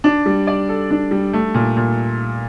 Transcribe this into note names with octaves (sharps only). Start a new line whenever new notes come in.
D4
G3
D5
A4
D4
G3
A3
A#2
A#2